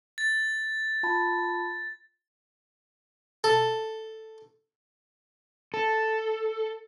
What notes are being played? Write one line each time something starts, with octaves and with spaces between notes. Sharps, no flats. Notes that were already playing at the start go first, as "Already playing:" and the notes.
A6
F4 A5 B5
A4
A4